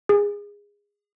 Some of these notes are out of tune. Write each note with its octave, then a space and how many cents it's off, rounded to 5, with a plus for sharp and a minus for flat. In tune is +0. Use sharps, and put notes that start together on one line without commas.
G#4 -20